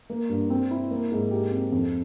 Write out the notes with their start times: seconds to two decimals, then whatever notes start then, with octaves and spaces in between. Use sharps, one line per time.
0.10 A#3
0.29 G2
0.50 C4
0.71 E4
0.91 A#3
1.11 G#2
1.31 G4
1.52 C4
1.72 F2